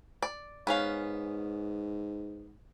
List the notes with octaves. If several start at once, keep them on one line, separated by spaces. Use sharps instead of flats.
D5
G#2 B3 C#4 F5